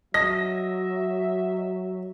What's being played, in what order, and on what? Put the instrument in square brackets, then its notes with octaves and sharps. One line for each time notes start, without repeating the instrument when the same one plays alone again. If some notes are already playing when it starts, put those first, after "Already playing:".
[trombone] F#3 [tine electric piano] D#5 [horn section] E5 [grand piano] A#6